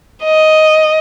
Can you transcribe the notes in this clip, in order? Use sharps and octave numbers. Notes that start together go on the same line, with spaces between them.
D#5